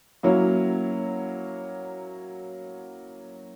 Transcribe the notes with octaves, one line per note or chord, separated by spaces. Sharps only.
F#3 A#3 C#4 E4